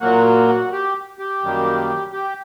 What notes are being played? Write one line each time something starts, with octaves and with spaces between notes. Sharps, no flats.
A#2 F#3 A#3 F#4
F#4
G4
G4
F#2 D#3 G3 A#3
G4